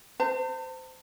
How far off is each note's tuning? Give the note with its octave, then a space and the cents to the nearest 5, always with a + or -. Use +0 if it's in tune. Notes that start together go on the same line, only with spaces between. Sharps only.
C5 -25 A5 +45